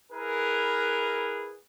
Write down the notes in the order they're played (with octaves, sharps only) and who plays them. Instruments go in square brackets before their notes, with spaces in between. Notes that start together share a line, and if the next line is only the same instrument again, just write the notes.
[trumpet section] E4 G#4 A#4 B4